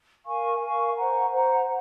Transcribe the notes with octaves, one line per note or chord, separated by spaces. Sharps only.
A#4 F5 G#5 C#6
A#4 F5 G#5 C#6
C5 F#5 A#5
C5 F#5 A#5